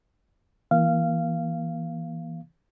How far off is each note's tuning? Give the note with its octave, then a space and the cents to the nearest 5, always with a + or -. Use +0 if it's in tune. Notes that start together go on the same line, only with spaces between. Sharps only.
E3 +0 A#3 +30 F5 -15